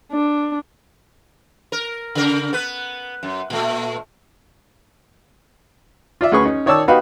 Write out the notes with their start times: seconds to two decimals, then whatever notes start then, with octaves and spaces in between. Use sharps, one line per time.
0.12 D4
1.72 A#4
2.15 C#3 A#4
2.53 B3 B4
3.23 F#2
3.50 A#2 A3
6.21 F4 D5 E5
6.32 D2 C#4 G#4 B4 C#6
6.45 C#4 D#4
6.66 D#3 C#5 D5 A5 E6
6.88 B3 D#4 F#4 G4 B4 F5